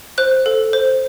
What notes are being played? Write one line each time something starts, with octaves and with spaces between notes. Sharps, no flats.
C5 F#6
A4
C5